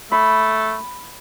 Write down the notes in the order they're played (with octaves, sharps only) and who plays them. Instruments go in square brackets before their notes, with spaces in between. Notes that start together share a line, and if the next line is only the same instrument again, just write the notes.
[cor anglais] A3 [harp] B5